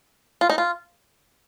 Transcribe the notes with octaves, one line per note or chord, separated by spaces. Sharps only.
F4
D#4
F4